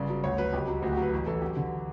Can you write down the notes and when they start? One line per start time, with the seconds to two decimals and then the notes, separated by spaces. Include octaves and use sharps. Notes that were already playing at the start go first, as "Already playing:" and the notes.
Already playing: G1 C#3 D5
0.10 F#3
0.24 D2 C#5
0.38 F#3 B4
0.53 C#2 G4
0.68 F#3
0.82 D2 F#4
0.93 G4
0.97 F#3 B4
1.13 A1
1.26 E3 A4
1.42 F#3 G4
1.57 D3